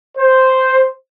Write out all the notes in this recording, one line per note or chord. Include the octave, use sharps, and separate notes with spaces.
C5